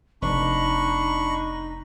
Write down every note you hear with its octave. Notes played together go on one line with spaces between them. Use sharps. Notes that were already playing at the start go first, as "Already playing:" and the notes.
F1 D4 D#4 B5 C#6